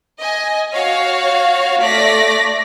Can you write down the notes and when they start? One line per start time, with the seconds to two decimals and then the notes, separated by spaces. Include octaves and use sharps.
0.19 D#5 G#5
0.73 F#4 C#5 F5
1.81 A3 D5 A#6 B6